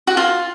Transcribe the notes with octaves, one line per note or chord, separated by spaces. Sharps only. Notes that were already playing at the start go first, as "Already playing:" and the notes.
F#4
F4